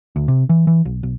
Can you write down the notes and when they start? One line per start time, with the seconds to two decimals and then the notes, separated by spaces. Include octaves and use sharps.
0.16 D2
0.28 C3
0.49 E3
0.67 E3
0.85 B1
1.03 B1